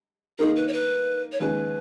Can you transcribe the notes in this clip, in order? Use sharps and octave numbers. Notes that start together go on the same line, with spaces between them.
D#3 A#3 D#4 G#4 A#4
B4
C#5
B4
C#5
D#2 C#3 G#3 B4